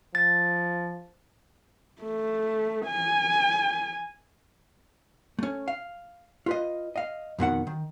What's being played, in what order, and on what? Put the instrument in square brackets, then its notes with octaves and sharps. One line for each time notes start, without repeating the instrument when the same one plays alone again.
[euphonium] F3 [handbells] A6
[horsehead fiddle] A3
G#5
[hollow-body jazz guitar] A3 C#4
F5
F4 B4 D#5
D#5 F5
F2 B2 D#3 F#5
D#3